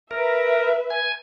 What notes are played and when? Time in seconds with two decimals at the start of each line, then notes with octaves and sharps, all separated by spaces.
0.11 A#4 B4 E5
0.90 G#5